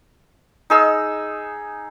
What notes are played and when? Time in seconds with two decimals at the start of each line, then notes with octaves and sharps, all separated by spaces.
0.70 D#4 G#4 E6